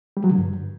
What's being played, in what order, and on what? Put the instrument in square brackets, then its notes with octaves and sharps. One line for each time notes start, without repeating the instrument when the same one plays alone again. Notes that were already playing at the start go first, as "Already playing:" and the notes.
[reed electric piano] G3
F#3
D3
G2